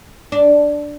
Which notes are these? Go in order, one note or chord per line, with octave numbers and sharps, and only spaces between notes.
D4